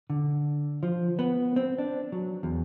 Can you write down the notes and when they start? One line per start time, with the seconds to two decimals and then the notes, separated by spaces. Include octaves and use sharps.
0.10 D3
0.83 F3
1.19 B3
1.56 C4
1.78 D4
2.12 F#3
2.43 E2